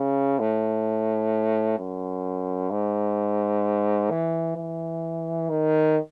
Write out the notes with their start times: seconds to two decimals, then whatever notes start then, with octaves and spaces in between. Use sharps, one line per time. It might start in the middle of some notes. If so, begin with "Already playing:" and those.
Already playing: C#3
0.39 A2
1.79 F#2
2.71 G#2
4.10 E3
4.56 E3
5.49 D#3